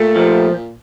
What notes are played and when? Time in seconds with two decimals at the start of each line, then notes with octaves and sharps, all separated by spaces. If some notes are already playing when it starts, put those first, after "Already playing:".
Already playing: A#2 A3
0.16 F3